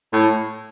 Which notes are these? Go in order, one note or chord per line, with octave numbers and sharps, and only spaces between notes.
A2